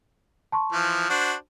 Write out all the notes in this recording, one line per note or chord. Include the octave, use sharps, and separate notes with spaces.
A5 C6 C#6
E3 F3
D4 F#4 C5